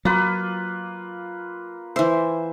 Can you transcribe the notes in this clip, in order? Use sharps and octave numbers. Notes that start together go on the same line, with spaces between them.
F#3 A#3 F4 B4
E3 C5 E5